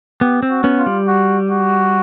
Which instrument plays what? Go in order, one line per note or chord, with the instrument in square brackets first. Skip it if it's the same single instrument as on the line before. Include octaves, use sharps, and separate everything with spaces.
[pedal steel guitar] B3 [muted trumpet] G4
[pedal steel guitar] C4
[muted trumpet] F#4
[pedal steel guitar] B3 C#4
[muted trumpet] F4
[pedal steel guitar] G3
[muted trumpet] F#4
F#4